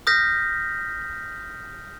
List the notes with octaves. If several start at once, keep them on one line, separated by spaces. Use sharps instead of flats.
D#6 F6 G6 A#6 B6